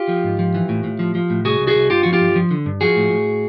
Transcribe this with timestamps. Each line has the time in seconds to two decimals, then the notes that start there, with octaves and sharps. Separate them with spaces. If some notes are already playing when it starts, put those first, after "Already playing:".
Already playing: F4 G4
0.09 F3
0.24 G#2
0.39 F3
0.54 E3
0.69 A2
0.84 A2
0.99 F3
1.15 F3
1.30 A2
1.45 C2 F#4 G#4
1.60 C2
1.67 F#4 G#4
1.75 C2
1.90 G2 F4 G4
2.03 F3 F#4
2.13 F4 G4
2.21 G2
2.36 F3
2.51 D3
2.66 G2
2.81 F3 F#4 G#4
2.96 A2
3.11 A2